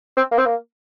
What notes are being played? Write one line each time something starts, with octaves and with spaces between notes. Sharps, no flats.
C4
A#3
C4
A#3